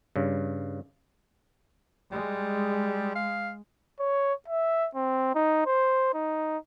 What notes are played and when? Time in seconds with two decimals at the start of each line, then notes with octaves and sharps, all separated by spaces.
0.16 G2 C#3
2.12 G3 G#3
3.15 F5
4.00 C#5
4.48 E5
4.95 C4
5.35 D#4
5.66 C5
6.14 D#4